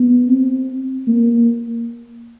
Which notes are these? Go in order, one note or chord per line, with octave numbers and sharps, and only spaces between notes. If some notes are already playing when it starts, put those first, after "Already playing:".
Already playing: B3
C4
A#3